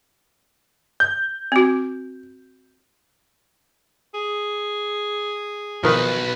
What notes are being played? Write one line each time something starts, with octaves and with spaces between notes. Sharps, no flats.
G6
C4 F#4
G#4
B1 D#3 F3 B4